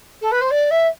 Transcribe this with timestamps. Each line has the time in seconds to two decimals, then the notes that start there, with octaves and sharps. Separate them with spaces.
0.21 A4
0.31 B4
0.41 C5
0.50 D5
0.70 E5